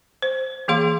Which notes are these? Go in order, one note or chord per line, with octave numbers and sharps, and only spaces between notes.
C5
E3 A#3 G#4 F5 C6